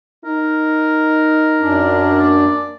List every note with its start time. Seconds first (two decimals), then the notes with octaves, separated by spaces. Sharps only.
0.25 D#4 A#4
1.61 F#2 D4
2.20 A#3 A#4 D5